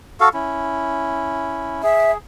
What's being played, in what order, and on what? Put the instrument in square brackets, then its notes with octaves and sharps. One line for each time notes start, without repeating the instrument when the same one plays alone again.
[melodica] F#4 A4 F5
C#4 E4
[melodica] G#4 [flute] E5